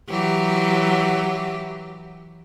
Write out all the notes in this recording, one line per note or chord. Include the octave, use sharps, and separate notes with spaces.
E3 F#3 G4